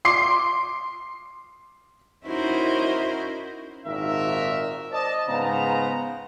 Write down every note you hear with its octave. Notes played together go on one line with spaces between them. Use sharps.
C6 D6 C7
C#4 D#4 E4 F#4 A#4 C5
G#1 A#2 D#3 F#4 A#4 E5
C5 D5 D#5 A5
G#2 C#3 B3 B4 C5 A#5